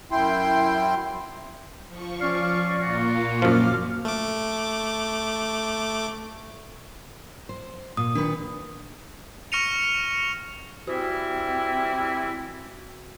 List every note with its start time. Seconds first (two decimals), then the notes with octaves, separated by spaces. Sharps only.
0.12 F#2 E4 G5 C6
1.88 F3 C#6
2.21 C#4 D5 F5
2.82 A#2 A#3 F4 F#4
3.42 F#2 F3 D6 F6
4.05 A3 D6
7.49 C5
7.97 A#2 D#6
8.15 D#3 D4 B4
9.52 C#6 F6 A#6 C#7 D#7 F7
10.87 E3 G3 C4 E4 F#4